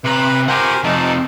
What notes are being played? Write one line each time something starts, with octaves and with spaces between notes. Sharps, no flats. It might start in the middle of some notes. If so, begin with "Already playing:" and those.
C3 B4 A#5 B5
G4 A#4 C5 F#5 G#5
F2 C3 D#4 A5